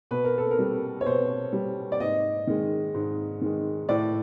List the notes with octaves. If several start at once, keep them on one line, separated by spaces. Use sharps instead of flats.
B2 B4
A#4
A4
A#4
G3
C#5
B2 C5
G3
D5
G#2 D#5
D#3 G#3
G#2
D#3 G#3
A2 D5